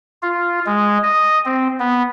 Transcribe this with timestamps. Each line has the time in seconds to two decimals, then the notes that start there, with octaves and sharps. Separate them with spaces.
0.22 F4
0.66 G#3
1.03 D#5
1.46 C4
1.80 B3